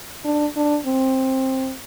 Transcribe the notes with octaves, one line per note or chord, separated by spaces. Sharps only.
D4
D4
C4